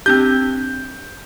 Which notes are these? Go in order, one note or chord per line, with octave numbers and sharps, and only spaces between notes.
C4 D4 G4 G6